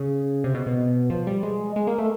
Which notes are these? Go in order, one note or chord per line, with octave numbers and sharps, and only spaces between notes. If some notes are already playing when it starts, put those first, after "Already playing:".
Already playing: C#3
C3
B2
B2
F3
G3
G#3
G#3
A#3
A3